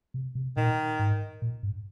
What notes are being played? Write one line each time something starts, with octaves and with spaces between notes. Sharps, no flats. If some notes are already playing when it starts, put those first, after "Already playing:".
C3
C3
A#2 D#3
G#2
A#2
G2